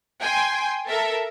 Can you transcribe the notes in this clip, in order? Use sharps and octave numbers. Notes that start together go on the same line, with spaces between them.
G5 G#5 C6
A4 A#4 E5